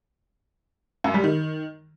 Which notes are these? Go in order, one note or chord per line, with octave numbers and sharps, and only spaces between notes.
F#2
G3
D#3